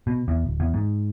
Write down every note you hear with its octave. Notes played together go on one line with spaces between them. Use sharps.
B2
E2
D1
E2
G#2